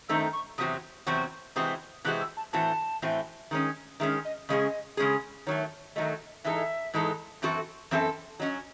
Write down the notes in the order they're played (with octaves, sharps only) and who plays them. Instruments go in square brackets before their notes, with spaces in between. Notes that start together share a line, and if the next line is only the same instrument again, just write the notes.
[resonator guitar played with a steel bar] F#2 D#3 A3 C4 D#4 [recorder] E6
[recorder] C#6
[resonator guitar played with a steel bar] E2 C3 F#3 C4 F#4 [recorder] D#6
[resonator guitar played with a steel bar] E2 C3 F#3 C4 F#4 [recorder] C#6
[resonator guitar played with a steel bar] C3 E3 G#3 C4 F#4 [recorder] D#6
[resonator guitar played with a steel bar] C3 E3 G#3 C4 F#4 [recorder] F#6
[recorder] E6
A5
[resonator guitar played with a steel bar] A2 E3 A3 C4 F#4 [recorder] A5
[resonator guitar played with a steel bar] A2 E3 A3 C4 F#4
D#3 G#3 C#4
[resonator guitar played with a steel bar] D#3 G#3 C#4 [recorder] E5
[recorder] D#5
[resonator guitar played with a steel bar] C#3 G#3 C#4 G#4 [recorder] D#5
[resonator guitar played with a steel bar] C#3 G#3 C#4 G#4
[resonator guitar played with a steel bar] D#3 F#3 A3 [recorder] C#5
[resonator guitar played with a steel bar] D#3 F#3 A3 [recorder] D#5
[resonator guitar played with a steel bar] G#2 E3 G#3 D#4 A4 [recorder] E5
[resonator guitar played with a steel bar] G#2 E3 G#3 D#4 A4
F#2 E3 C4 F#4 A4
[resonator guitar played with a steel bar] F#2 E3 C4 F#4 A4 [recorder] E5
[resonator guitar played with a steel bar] F#3 C#4 F#4 [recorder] D#5